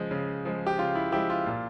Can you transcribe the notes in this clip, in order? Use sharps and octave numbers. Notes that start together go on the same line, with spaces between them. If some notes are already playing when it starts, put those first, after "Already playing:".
Already playing: C#3 F3 G#3
C#3
F3 G#3
G4
C#3 F4
E4
F3 G#3 E4 G4
F4
A#2